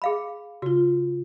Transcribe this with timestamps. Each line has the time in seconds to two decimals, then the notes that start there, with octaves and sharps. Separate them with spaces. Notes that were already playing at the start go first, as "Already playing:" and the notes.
0.02 G#4 F5 B5
0.62 C#3 F4 F#4